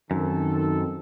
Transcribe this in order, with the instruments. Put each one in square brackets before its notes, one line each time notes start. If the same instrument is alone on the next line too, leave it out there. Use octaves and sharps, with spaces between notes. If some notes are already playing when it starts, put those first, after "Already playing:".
[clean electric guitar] F#2 [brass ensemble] D#3 C4 A4